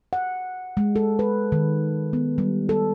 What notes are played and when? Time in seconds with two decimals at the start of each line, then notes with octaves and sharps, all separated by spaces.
0.13 F#5
0.77 G#3
0.96 A4
1.19 B4
1.52 D#3
2.13 B3
2.38 G3
2.69 A4